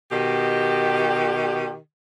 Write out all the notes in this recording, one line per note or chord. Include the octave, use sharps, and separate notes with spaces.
B2 D#3 G4